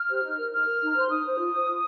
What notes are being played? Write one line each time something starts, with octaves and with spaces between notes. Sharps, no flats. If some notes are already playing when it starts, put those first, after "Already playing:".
Already playing: F6
G4 C5
D#4
A#4
D#4 F6
A#4
D#4
A#5
C5 C6
D#4 D#6
C5
F4
C5
F4